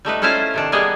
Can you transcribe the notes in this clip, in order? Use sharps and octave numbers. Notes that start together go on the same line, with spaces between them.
G3 A3 D#4 B4
A3 C#4 E4 F4 C5 F5
C3 D#3 D4
G3 A#3 B3 D4 G#4 D#5